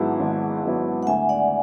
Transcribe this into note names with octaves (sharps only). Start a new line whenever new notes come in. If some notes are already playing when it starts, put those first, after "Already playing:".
Already playing: G#1 G#2 F#3 B3 E4 F#5 A5
G#1
G#2 F#3 B3 E4
F#5
D2 E5 G#5
D5 F#5